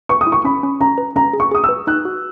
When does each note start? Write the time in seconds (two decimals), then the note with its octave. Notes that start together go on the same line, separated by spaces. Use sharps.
0.09 B4 C#6
0.21 D#6
0.27 E4
0.32 C#6
0.44 C#4 B5
0.63 C#4
0.81 C#4 A#5
0.98 B4
1.16 C#4 A#5
1.33 G#4
1.40 C#6
1.51 G#4 D#6
1.64 B4 E6
1.87 D#4 F#6
2.05 F#4